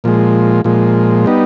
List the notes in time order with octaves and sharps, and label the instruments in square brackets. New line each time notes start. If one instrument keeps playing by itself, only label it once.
[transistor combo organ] A#2 F3 G#3
A#2 F3 G#3
G3 B3 D#4